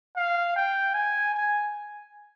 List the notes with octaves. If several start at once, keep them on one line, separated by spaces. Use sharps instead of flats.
F5
G5
G#5
G#5